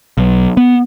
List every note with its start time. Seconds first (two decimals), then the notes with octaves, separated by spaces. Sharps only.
0.18 B1
0.57 B3